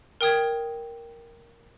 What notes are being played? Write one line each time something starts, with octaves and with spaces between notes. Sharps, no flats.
A#4 G5 D#6 G#6